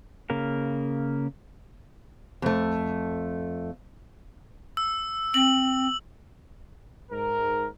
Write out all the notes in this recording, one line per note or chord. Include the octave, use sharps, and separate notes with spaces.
C#3 A#3 A#4
F2 A3
E6
C4 F#7
G#2 A#4